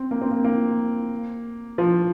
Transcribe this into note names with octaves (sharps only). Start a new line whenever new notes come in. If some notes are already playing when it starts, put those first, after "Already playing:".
Already playing: C4
A#3
C4
A#3
A#3
F3